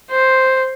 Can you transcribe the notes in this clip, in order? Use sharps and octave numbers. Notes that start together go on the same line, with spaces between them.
C5